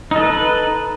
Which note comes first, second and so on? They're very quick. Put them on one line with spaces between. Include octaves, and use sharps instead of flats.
D#4 A4 B4